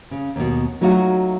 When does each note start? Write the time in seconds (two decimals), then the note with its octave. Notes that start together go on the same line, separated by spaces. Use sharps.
0.11 C#3
0.36 D#2 B2
0.81 F#3 A3 D#4 F4 F#4